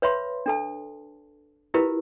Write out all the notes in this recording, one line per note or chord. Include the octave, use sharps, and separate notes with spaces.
B4 C#5 E5 B5 C6
D4 A4 A5
E4 F4 G4 A#4 B4